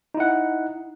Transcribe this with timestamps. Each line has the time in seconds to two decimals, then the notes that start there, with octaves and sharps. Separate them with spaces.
0.14 D#4
0.17 E4
0.20 F#5